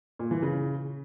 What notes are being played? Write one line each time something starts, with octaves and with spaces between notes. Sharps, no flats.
A#2
E3
C#3